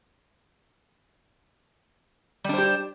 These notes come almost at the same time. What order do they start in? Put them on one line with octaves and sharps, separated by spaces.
G3 D4 C5 G4